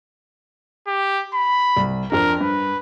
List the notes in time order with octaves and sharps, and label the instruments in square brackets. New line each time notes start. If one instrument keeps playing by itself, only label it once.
[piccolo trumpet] G4
B5
[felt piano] C2
[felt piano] F2 D4 [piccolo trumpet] A#4
[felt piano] G2 [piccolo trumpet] B4